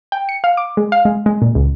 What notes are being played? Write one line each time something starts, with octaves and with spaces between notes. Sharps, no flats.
G5
C#7
F5
D6
G#3
F5
G#3
G#3
A#2
C#2